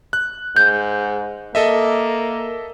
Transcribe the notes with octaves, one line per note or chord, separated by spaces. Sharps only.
F#6
G#2 G6
A#3 A4 D#5 E5